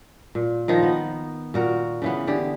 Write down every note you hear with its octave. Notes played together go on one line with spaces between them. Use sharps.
A#2
D#3 F3 D#4
B3
A#2 F#4 A#4
C#3 E3 B3
D3 G4 G#4